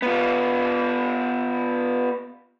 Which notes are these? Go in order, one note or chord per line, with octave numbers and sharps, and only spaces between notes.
B3 F4